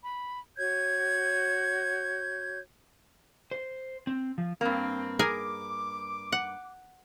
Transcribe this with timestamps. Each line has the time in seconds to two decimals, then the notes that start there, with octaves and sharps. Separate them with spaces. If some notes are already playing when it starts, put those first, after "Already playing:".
0.03 B5
0.58 F#4 C#5 G6 G#6
3.51 C5
4.07 C4
4.38 F3
4.61 G2 A#3 C4
5.19 G#4 A#4 G#5 D6
6.32 F#5